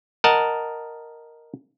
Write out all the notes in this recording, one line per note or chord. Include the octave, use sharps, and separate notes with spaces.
A#4 D#5 F#5 A5